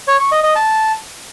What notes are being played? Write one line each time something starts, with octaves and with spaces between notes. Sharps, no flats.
C#5
C#6
D#5
D#5
A5